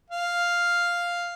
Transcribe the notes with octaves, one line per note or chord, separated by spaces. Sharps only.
F5